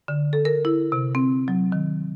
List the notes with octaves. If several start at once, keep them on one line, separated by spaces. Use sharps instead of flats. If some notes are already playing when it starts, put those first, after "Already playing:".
D3
A4
A#4
E4
C3
C4
F#3
D#3